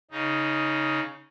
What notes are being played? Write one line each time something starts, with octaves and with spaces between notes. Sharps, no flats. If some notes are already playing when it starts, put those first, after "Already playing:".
C#3 D#4